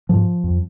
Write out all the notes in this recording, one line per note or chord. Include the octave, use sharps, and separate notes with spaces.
G#2 F3
F2